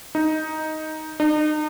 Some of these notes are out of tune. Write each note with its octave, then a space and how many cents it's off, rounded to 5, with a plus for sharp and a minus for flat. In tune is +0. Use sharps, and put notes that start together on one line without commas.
D#4 +5
D#4 -40